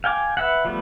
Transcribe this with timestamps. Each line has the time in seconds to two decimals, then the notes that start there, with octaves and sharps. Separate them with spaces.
0.04 F5 G5 G#5 D6
0.37 B4 E5 F#5
0.65 F3 G3 A3 B3